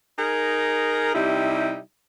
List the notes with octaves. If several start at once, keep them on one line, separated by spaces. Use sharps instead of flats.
D#4 G#4 A#4
C3 G3 D#4 E4